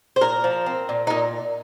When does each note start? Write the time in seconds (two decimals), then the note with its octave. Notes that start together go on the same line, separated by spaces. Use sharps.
0.16 C5
0.21 A#2 A#4
0.44 F3
0.66 C4
0.89 A#2
1.07 A#2 D#4